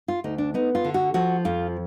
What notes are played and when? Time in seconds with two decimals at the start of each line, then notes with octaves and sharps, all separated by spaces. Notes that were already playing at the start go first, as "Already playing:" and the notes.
0.08 F4
0.24 D2 D#4
0.38 D4
0.54 B3 D#4
0.75 F4
0.84 D3
0.94 F#4
1.14 F3 F#4
1.45 F2 F4